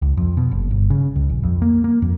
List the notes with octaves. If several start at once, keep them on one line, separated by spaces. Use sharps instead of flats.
C#2
F2
B2
F#1
G1
C#3
C#2
A#1
F2
A#3
A#3
F2